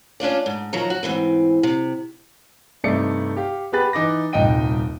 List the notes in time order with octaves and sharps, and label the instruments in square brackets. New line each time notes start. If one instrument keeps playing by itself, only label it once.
[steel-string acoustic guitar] C#4 D4 F4 D5
G#2
D#3 F3 F#3 A#5
F#4
G#2 C3 E3 C4
C3
[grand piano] G2 C3 A3 D#4 D5 C#7
G4 F5
B3 G4 G#4 B4 F#6 A6
E3 D#4 D6 A#6
D#1 C2 D#4 D#5 G5 D#7